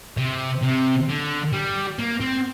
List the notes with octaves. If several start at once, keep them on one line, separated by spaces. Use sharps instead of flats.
C3
C3
D3
G3
A#3
C4